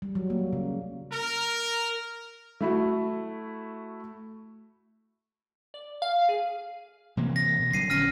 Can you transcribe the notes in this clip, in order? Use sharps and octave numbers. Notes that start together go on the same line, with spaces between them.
G3
F#3
A#3
C#3
A#4
A3 E4 F#4
D5
F5
G#4
C3 E3 A#3
A#6
B2
D3 F#3 G3 C7 D#7
A#1 C#4 F6 A#6 D#7